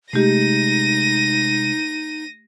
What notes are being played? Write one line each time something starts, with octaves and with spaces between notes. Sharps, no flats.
C3 G#3 A3 D#4 G4 A#6 D#7